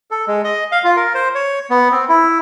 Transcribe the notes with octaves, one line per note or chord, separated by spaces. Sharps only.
A4
G#3
D#5
F5
F4
A#4
C5
C#5
B3
C4
E4